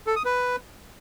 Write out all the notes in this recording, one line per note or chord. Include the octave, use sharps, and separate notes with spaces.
A4
D#6
B4